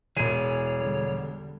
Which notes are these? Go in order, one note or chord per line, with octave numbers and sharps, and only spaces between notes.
E1 E3 G#4 C#5 D#7
D3 G3